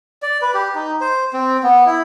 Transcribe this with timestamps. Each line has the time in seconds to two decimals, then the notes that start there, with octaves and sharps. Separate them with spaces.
0.22 D5
0.42 B4
0.54 G4
0.75 D#4
1.01 C5
1.33 C4
1.63 B3
1.86 E4